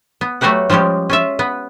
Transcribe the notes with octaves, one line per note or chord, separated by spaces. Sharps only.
B3
F#3 A3 F#4 G4 B4 F#5
F3 G3 G#3 C#4 G4
C#4 F4 E5
B3 B4